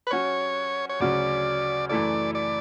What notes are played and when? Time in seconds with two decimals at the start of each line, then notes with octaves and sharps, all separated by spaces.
0.07 B4
0.11 F#3 C#4 F#4 C#5
0.89 C#5
1.00 D2 C#3 F#3 C#4 F#4 D5
1.89 F#2 E3 A3 E4 A4 D5
2.35 D5